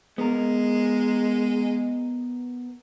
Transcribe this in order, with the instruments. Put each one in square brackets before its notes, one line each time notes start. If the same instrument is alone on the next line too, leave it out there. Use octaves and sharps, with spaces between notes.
[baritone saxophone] G#3 [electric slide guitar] B3 A#4